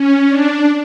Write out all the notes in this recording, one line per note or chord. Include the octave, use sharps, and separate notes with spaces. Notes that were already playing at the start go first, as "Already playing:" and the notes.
Already playing: C#4
D4